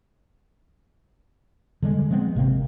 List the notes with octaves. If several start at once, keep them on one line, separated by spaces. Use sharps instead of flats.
D3 G3 G#3
F3 G#3 B3 C4
G#1 C3 A#3 C4